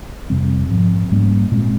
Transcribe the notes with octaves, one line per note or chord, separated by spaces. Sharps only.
F2 C3 G3 C4
G#2 F3 C4
G#2 G3 A#3 C#4
A#2 G#3 C4